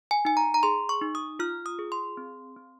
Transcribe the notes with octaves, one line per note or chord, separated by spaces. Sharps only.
G#5
D#4 G#5
A#5
A#5
G#4 C6
C#6
D#4
D#6
F4 F6
D#6
G#4
C6
C4
C4